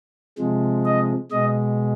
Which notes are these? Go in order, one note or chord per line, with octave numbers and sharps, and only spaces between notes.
C3 F3 G#3
D#5
B2 G#3 D#5